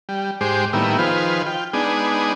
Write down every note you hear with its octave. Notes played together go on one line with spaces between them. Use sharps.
G3
G#2 G#3 G4 C5 D6
A2 D#3 G3 A#3 B3 E4
D#3 F3 F4 G#4 B4 C5
F4 G5
G#3 B3 D4 D#4 G#4